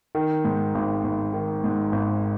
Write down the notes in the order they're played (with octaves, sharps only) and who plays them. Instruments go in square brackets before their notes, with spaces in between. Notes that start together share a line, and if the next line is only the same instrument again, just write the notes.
[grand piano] D#3
G#2
G#1
G#1
D#3
G#2
G#1